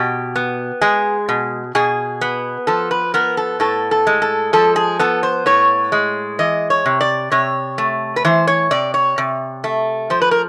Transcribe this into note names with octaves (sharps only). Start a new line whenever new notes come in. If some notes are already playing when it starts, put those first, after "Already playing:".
Already playing: B2 G4
B3
G#3 G#4
B2
B2 G#4
B3
F3 A4
B4
B3 A#4
A4
A2 A4
A4
G#3
A4
F3 A4
G#4
B3 A4
C5
A2 C#5
G#3
E3 D#5
C#5
C3
D5
C3 C#5
A3
B4
E3 C5
C#5
C3 D5
C#5
C3
A3
F3 C5
B4
A#4